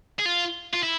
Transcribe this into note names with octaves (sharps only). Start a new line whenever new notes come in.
G#4
F4
F4
E4